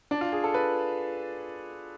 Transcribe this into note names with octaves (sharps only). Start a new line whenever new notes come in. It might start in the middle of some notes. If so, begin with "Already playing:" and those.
D4
F4
G#4
A4
B4